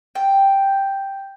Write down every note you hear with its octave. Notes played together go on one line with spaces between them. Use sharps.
G5